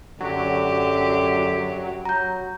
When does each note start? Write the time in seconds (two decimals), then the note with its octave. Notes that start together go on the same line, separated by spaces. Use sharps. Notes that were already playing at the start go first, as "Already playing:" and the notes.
0.20 F#2 D3 F#3 G4
2.05 F#3 A#5 G6